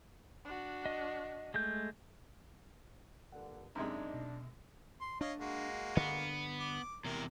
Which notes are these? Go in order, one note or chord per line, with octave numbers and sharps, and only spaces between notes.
D4 F#4
D#5
G#3 A3 G6
G2 A#2 D3 F#5
F#2 C3 G#3 D4 D#4 A#5 G#6
B2
C6
D4 C#5 D#5 F5
G#3 A#3 F#4
G2 D3 B3
D6
E2 C3 A#4